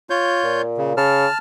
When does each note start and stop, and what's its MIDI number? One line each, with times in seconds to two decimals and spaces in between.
0.10 0.62 65
0.10 0.62 73
0.10 0.62 91
0.44 0.92 46
0.78 0.93 49
0.97 1.27 49
0.97 1.38 81
0.97 1.38 89